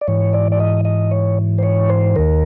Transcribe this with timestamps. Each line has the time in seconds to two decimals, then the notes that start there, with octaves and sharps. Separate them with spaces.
0.01 D5
0.08 G#2 E3 C#5
0.33 D5
0.52 D5
0.60 D#5
0.85 D#5
1.11 C#5
1.58 C5
1.63 C#5
1.89 C5
2.16 D#2 D#3 A#4